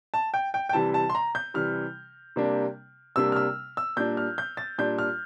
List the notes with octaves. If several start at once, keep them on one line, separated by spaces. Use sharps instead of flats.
A5
G5
G5
G5
C3 E3 G3 A5
A5
C6
A#5
G6
C3 E3 G3 F6
C3 G3 A#3 D4
C3 G3 A#3 D4 E6
F6
E6
E6
A#2 G3 D4 G6
F6
G6
A6
A#2 G3 D4 G6
F6